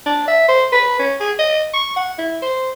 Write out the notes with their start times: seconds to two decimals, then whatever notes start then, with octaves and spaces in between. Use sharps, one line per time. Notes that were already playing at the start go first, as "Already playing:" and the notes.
0.06 D4
0.28 E5
0.49 C5
0.72 B4
0.99 C#4
1.20 G#4
1.39 D#5
1.74 C#6
1.96 F#5
2.19 E4
2.42 C5